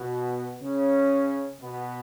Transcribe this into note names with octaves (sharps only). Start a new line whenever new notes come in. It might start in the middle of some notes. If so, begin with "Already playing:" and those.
Already playing: B2 B3
C#3 C#4
B2 B3